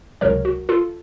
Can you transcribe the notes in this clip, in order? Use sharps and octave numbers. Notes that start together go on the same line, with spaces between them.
C#2 C3 F#3 A#4 C#5
F#4
F4 A4